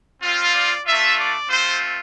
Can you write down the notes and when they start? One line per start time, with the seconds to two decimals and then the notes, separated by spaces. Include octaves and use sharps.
0.22 G3 C4 F4
0.54 D5
0.85 A3 D4 F4 E5
1.17 D5
1.49 A3 C4 F4 C5